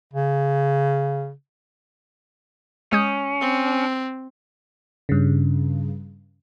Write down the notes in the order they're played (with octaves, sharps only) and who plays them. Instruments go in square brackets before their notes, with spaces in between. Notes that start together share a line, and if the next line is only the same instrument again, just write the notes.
[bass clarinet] C#3
[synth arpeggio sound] G#3 D#6 G6 [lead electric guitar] C#4
[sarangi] C4
[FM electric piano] G2 C#3